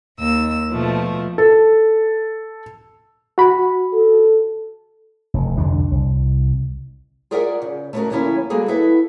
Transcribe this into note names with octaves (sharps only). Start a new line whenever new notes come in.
D#2 E6
B2 F3 A3
A4
F#4 B5
A4
F1
C2 F2 D3 D4
C2
F4 G#4 A#4 D5 E5 F#5
C#3
A3 B3 C#4 D#4 F#4 A#4
D2 F3 A#3 C#4 E4 C#5
G3 A#3 F#4 G#4 A4
E4 A4 B4 E5 F#5